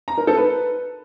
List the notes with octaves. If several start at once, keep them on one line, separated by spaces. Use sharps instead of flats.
A#5
A#4
A4
B4